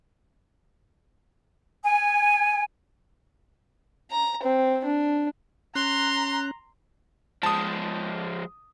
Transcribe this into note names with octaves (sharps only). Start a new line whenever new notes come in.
G#5
A#5
C4
D4
C#4 A#5 C6 F#6
F3 G#3 A5 D#6